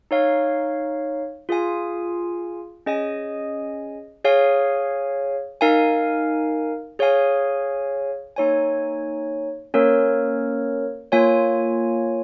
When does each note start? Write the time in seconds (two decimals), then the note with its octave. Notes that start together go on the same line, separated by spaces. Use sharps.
0.11 D#4 C#5 F5
1.49 F4 G#4 F5 G#5
2.86 C#4 G#4 D#5 G#5
4.24 G#4 C#5 F5 G#5
5.61 D#4 A#4 F5 G#5
6.99 G#4 C#5 F5 G#5
8.36 A#3 D#4 C#5 G#5
9.74 A#3 C#4 A#4 C#5
11.12 A#3 F4 C#5 G#5